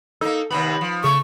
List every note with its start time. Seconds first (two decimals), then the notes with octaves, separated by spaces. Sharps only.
0.21 A#3 D#4 A4
0.50 D#2 C3 B3 B5
0.81 F3
1.04 C#3 A3 C#6